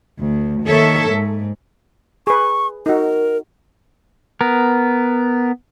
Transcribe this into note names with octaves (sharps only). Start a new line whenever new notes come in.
D2
D#3 A#3 A4 C#5 E5
G#2
G#4 B4 C#6
D#4 F#4 A#4
B3 A#4